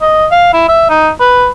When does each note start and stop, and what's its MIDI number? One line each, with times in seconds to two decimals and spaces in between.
0.01 0.26 75
0.31 0.49 77
0.53 0.65 64
0.69 0.87 76
0.90 1.10 63
1.20 1.48 71